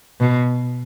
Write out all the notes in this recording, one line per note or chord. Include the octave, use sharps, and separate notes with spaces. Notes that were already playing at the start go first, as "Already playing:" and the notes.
B2